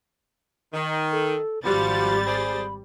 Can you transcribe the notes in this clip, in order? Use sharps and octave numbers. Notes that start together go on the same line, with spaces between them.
D#3
A4
G#1 F3 G3 F#4 B5 A6
G#4 C5 D5